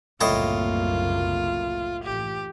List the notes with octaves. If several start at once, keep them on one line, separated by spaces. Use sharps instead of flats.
F#1 C2 A2 A#3 F4 D#5 A5
A1 G4